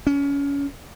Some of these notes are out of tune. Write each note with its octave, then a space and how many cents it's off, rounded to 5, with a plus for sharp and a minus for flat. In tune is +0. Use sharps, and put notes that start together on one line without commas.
C#4 +25